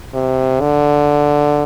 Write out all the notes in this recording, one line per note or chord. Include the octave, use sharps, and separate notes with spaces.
C3
D3